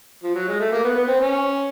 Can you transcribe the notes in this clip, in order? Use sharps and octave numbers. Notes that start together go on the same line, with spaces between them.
F3
F#3
G#3
A3
A#3
B3
B3
C4
C#4